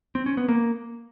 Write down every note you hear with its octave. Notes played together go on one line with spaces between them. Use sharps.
C4
C#4
B3
A#3